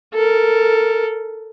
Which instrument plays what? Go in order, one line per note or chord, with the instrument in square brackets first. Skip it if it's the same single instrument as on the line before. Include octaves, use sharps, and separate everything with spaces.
[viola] A4 A#4